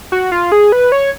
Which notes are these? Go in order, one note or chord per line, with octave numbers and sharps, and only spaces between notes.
F#4
F4
G#4
B4
C#5